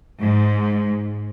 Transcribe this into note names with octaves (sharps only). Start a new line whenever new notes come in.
G#2